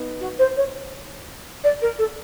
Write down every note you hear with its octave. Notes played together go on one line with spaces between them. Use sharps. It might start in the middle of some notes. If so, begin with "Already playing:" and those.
Already playing: B3 D#4
F#4
C5
C#5
D5
A#4
A4